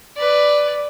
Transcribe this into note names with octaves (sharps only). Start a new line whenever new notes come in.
B4 D5